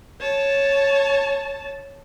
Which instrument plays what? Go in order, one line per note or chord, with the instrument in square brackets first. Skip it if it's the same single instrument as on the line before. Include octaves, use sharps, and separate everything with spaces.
[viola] C#5 A5